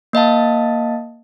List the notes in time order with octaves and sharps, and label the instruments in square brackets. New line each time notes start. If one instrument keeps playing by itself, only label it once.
[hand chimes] A#3 D#5 F5 A5